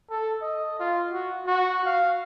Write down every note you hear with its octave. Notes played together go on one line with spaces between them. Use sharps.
A4
D#5
F4
F#4
F#4
F5